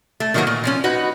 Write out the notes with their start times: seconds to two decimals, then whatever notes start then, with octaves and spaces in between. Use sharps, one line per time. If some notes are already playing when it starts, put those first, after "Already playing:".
0.20 A3
0.34 D#3 E3 F#3 G#3 A#3 B3
0.47 A#2
0.64 F3 C4 C#4
0.84 D#4 F#4 B4